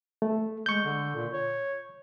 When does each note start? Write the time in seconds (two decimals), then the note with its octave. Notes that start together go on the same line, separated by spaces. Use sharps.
0.22 A3
0.66 G#3 C#6 G6
0.85 D3
1.15 A#2
1.33 C#5